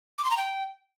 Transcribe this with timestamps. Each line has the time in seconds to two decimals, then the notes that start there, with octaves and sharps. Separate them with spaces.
0.18 D6
0.25 C6
0.31 A#5
0.37 G5